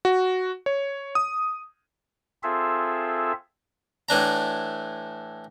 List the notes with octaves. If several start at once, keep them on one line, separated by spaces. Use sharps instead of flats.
F#4
C#5
D#6
C4 F4 G#4 A4 E5
A2 E3 D4 A#5